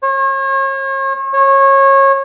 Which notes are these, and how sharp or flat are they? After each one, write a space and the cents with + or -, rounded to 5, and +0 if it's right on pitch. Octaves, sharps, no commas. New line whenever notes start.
C#5 -40
C#5 -25